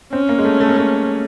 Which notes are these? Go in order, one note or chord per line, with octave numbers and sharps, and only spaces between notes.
C4 C#4
A#3
G#3
A3
A3
A#3
A3